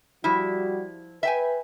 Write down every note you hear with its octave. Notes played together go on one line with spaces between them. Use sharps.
F3 G3 E4 F#4
B4 E5 G5 G#5